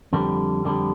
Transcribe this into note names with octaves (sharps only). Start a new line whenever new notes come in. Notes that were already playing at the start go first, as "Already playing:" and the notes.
F2 D3 G3
F2 D3 G3